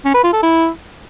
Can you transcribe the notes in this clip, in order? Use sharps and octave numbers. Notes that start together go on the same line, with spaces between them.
C#4
B4
F4
A4
E4